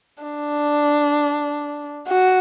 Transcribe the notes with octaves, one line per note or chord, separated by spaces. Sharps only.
D4
F#4